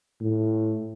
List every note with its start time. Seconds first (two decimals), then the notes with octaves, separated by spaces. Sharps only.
0.21 A2